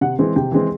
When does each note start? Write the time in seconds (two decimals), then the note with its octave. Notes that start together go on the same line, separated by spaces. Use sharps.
0.01 C3 F#5
0.19 E3 G#3 C4
0.36 C3 G5
0.52 E3 G#3 C4